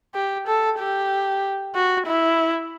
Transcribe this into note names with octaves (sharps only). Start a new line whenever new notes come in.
G4
A4
G4
F#4
E4